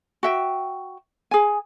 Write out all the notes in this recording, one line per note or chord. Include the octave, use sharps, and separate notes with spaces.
F#4 E5 G5
G#4 G#5